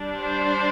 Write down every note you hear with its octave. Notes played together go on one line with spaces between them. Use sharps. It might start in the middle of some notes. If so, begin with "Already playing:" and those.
Already playing: G3 D4
C5